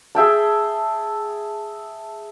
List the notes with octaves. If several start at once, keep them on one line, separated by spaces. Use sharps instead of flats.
G#4 E5 G5 A5